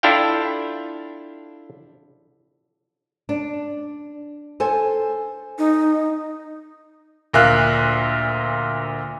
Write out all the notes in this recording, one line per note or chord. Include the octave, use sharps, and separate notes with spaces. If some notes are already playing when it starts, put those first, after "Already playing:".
D4 E4 F4 A4 F5 G5
D4
A4 C5 G#5
D#4
D2 A#2 E5 F5 F#6